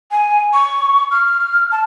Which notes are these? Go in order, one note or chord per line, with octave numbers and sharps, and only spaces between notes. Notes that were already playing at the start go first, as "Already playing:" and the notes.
G#5
C#6
F6
A5